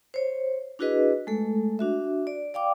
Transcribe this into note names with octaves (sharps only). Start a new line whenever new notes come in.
C5 C#5
D4 E4 F#4 G#4 B4 D#5
G#3 A3 A4
D4 F#4 E5
D5
D5 F5 G5 D6